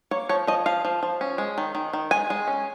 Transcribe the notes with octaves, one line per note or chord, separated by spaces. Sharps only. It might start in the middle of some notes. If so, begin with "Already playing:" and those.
A#3 C#5
F3 C#5
F3 D#5
F3 F5
F3
F3
C#4
G#3
D#3
D#3
D#3
G#3 G#5
G#3
C#4